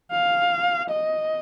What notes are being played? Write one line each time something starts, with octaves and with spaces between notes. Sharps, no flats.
F5
D#5